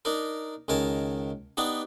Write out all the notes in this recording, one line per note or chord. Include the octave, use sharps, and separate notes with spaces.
D4 D#4 A#4
C#2 D#3 A#4 G#5 A5
B3 D4 D#4 G4